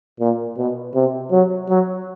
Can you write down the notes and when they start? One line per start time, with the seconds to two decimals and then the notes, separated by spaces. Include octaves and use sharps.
0.19 A#2
0.57 B2
0.95 C3
1.31 F#3
1.68 F#3